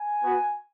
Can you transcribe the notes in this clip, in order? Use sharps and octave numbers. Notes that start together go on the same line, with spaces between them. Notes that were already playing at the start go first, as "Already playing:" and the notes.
Already playing: G#5
B3 F#4